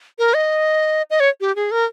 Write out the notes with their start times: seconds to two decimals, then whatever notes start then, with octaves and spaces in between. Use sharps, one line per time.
0.19 A#4
0.34 D#5
1.10 D#5
1.20 C#5
1.41 G4
1.56 G#4
1.71 A#4